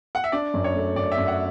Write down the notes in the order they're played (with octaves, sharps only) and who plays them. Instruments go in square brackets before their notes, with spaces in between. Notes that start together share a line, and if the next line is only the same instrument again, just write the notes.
[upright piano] F#5
E5
[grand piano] D4 [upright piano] D5
[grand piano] F#2
[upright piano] C#5
[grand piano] A3
[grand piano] F#2 [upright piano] D5
[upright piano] E5
[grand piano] F#2
[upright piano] F#5